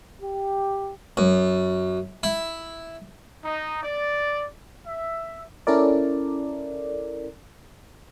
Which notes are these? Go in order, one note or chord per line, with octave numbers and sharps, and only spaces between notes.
G4
F#2
E4
D#4
D5
E5
C#4 E4 A4 A#4 D5